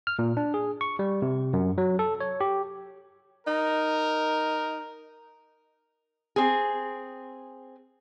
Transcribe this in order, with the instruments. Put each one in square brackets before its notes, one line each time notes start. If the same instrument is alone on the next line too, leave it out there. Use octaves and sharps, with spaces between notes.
[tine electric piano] F6
A#2
D4
G#4
C#6
G3
C3
F#2
F#3
A4
C#5
G4
[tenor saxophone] D#4 [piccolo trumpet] A#4
[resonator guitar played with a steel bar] C4 G#4